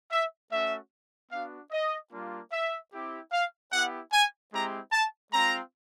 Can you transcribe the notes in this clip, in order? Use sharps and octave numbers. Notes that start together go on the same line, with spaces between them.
E5
A3 C#4 F#4 E5
B3 D4 F#4 F5
D#5
G3 A#3 D4 F4
E5
C4 E4 G4
F5
B3 E4 G4 F#5
G#5
G#3 C4 E4 G4 A#5
A5
G#3 C4 F4 A#5